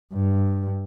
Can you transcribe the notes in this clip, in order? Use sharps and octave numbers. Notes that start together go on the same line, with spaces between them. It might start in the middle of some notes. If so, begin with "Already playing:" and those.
G2